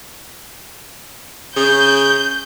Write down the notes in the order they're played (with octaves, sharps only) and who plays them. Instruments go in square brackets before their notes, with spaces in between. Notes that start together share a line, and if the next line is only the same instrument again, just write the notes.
[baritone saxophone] C#3 [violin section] G6